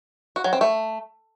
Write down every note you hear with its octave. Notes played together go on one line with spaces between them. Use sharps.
F#4
F#3
C4
A3